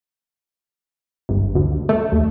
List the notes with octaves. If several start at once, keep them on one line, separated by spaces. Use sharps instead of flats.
G1
D2
A3
D#2